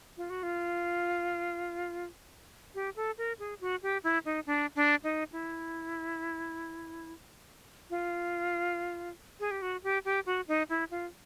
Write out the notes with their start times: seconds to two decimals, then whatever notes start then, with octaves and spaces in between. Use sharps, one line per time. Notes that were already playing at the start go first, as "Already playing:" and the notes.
0.17 F4
0.30 F#4
0.43 F4
2.75 G4
2.96 A4
3.18 A#4
3.39 G#4
3.61 F#4
3.83 G4
4.04 E4
4.25 D#4
4.46 D4
4.75 D4
5.04 D#4
5.32 E4
7.90 F4
9.40 G#4
9.51 G4
9.62 F#4
9.83 G4
10.05 G4
10.26 F#4
10.48 D#4
10.69 E4
10.91 F4